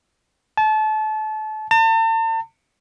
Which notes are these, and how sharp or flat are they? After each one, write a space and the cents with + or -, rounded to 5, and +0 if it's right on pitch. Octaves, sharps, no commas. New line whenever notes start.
A5 -30
A5 +40